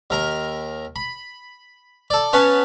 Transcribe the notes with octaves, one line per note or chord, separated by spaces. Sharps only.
D#2 A#4 A#5
B5
A4 D5
B3 C#4 B4 C#5 A5